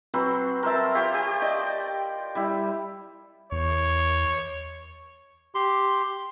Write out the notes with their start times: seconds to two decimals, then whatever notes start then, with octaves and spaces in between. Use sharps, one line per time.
0.14 F#3 C4 F#4 B4
0.63 A#4 C5 E5 A5
0.95 F4 G4 C5 C#5
1.14 G4
1.42 D5 D#5
2.35 G3 E4
3.52 E2 C#5
5.55 G4 C6